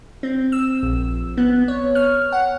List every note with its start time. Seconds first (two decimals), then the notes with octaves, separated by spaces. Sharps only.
0.23 C4
0.52 E6
0.83 A#1
1.37 B3
1.68 C#5
1.95 F6
2.32 F#5